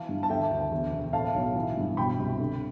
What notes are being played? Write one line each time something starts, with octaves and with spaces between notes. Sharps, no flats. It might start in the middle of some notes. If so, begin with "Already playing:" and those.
Already playing: E3 F5 A5
G2
A5
D3 E5 G5
D2
E2
E1
A2 F5 A5
B1
E3
G2
B2 G5 B5
C2
D3